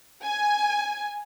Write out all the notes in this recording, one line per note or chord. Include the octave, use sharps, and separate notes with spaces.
G#5